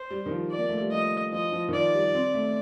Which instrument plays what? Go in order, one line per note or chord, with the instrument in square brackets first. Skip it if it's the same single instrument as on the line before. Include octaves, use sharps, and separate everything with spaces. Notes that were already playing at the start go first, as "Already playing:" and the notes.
Already playing: [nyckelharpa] C5
[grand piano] G3
D#3
F3
[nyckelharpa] D5
[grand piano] A#3
A3
G3
[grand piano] F3 [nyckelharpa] D#5
[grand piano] F3 [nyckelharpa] D#5
[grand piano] F3
D#3
[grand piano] F3 [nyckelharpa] D5
[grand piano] G3
C4
A3